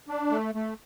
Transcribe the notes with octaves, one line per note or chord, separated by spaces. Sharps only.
D4
A3
A3